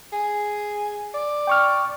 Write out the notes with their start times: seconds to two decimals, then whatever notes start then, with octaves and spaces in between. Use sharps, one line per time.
0.12 G#4
1.14 D5
1.47 G5 C#6 F6